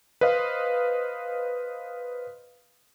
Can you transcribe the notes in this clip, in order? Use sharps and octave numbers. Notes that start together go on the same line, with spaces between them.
B4 C5 D#5 F5